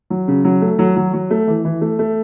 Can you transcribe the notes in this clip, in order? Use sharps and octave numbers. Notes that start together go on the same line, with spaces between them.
F#3
C#3
F#3
A3
F#3
F#3
F#3
A3
E3
E3
A3
A3